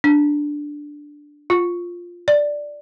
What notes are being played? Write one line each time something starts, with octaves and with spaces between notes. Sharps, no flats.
D4
F4
D5